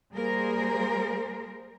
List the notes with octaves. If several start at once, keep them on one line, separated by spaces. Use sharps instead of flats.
G3 A#3 G#4 A#4 C5